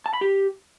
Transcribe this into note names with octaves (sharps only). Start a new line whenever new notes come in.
A5
B5
G4